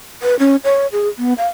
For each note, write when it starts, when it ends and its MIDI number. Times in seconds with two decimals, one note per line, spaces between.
0.22 0.38 71
0.39 0.56 61
0.64 0.87 73
0.92 1.08 68
1.19 1.33 59
1.38 1.47 77